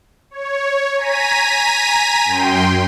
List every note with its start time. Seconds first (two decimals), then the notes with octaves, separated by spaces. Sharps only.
0.31 C#5
0.96 G#5 A#5 B6 D#7
2.25 F#2 G5 C6